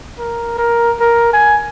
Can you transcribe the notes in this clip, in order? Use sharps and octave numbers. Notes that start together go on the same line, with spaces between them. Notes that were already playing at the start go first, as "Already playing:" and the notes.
A#4
A#4
A#4
G#5